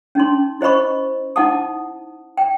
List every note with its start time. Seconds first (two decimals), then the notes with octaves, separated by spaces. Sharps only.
0.15 C#4 D#4 C6
0.61 E4 C5 D#5 B5 C#6
1.36 D#4 E4 F#5 A5 D#6
2.37 G5